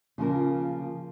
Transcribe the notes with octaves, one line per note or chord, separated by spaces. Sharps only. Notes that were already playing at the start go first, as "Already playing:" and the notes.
C#3 F3 A#3 F4 A#4